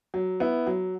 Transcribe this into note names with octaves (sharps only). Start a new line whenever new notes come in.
F#3
B3 E4
F#3